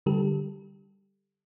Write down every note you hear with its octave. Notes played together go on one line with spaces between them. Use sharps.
D3 G3 G4 A4